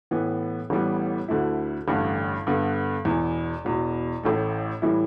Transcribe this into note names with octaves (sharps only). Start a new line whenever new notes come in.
A2 E3 B3
A1 A2 E3 G3 B3
D2 D3 A3 E4
A1 G2 D3 A3
G2 D3 B3
E1 E2 E3
E1 E2 B2
A1 A2 A3
A2 E3 G3 E4